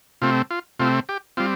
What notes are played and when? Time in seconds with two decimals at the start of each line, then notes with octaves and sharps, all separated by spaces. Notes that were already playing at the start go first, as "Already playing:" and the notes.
0.22 C3 A3 C4 F4
0.51 F4
0.79 C3 A3 C4 F4
1.09 G4
1.37 G3 C4 F4